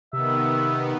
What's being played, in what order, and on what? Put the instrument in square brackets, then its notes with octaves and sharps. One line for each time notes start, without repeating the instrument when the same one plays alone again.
[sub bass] C3 [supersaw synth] D#3 B3 [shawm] E5